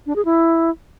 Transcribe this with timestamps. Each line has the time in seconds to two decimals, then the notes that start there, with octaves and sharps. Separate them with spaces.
0.07 D4
0.16 G#4
0.25 E4